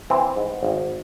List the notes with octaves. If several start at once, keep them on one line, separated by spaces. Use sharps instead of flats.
E3 C4
G#2
G#1